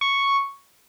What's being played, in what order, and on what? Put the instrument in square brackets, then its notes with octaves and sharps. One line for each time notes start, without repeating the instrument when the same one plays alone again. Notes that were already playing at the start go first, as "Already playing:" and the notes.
[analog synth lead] C#6